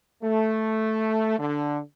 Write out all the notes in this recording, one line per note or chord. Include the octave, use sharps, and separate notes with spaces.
A3
D3